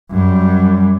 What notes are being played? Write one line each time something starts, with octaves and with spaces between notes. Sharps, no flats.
F#2 G3